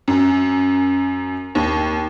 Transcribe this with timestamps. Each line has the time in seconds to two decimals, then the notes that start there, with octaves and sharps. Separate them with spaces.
0.08 F#2
1.55 D#2